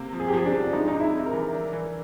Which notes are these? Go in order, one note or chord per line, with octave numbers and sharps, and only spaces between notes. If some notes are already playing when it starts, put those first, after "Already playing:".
Already playing: C3 A#3
F3
G#4
G4
F3 G#4
D4
F3
D4
G#3 D#4
D#4
C3
E4
G#3
A#4
E3
D4
E3